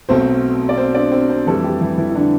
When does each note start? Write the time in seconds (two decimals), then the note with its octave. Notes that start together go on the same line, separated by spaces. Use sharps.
0.09 B1 B2 A3 C4 C5
0.69 D5
0.77 C4 C5
0.94 D4 D5
1.12 C4 C5
1.29 C4 C5
1.47 F2 E3 G3 A3 A4
1.63 G3 G4
1.81 E3 E4
1.98 E3 E4
2.10 E4
2.15 D3 D4